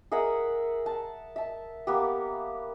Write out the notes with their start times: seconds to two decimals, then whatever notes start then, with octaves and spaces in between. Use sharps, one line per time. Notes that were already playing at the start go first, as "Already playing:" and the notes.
0.12 G#4 A#4 E5 F#5
0.86 A5
1.36 E5 A5
1.87 A#3 B3 G4